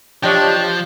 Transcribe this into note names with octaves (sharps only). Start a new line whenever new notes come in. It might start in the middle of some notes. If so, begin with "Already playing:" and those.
F3 D4 G4 C#5 D#5 G5